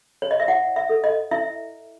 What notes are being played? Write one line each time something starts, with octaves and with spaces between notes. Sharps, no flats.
C#5
D#5
E5
E4 F#5
E5
A4
D#5
E4 E5